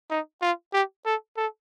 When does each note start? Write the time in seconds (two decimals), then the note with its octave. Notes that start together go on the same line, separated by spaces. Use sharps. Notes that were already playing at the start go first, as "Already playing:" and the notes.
0.10 D#4
0.42 F4
0.73 G4
1.05 A4
1.37 A4